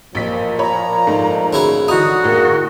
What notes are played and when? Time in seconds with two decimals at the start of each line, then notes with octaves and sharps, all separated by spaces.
0.15 A1 A#2 F3 B6
0.59 C#5 A#5 B5
1.07 G#2 A3
1.53 C#3 E4 F#4
1.88 D3 E3 D#4 F#4 D#6
2.24 A2 A#3 G#4 A#4